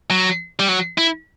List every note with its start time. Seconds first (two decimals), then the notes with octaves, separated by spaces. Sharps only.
0.10 F#3
0.60 G3
0.69 F#3
0.98 E4